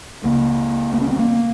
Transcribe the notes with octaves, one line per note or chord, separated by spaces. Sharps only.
C#2 C#3 A#3
A#3
C#4
C4
A#3